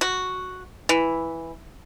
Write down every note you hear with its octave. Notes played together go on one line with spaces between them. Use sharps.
F#4
E3